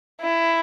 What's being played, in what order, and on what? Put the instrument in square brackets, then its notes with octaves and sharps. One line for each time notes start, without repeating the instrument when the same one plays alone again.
[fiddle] E4